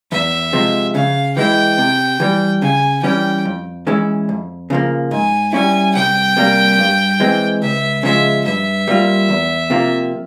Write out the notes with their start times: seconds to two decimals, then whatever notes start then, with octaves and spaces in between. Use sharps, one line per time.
0.11 E2 E5
0.53 C3 F3 G#3
0.95 C#3 F5
1.37 E3 G#3 E4 G5
1.78 C3
2.20 E3 G3
2.62 C#3 G#5
3.03 E3 G3 C#4 G5
3.45 F2
3.87 E3 G#3 C#4 E4
4.29 F2
4.70 C#3 F3 A#3
5.11 G#2 G#5
5.53 G3 C#4 E4 G#5
5.95 C2 G5
6.37 C3 G3 A#3
6.79 G2
7.20 E3 G#3 C4
7.62 C#2 E5
8.03 C#3 F3 G#3 E5
8.45 G2 E5
8.88 G3 A#3 F4
9.29 E2
9.70 C3 F3 A#3 F4